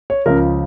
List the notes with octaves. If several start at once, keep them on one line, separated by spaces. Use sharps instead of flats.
C#5
C#2 C#3 F3 A#4